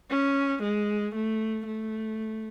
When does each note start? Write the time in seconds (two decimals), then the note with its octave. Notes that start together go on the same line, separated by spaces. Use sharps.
0.10 C#4
0.63 G#3
1.15 A3
1.67 A3